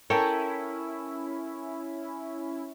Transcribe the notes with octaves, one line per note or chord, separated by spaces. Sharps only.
C#4 E4 A4 A#4 C#5 G5 G#5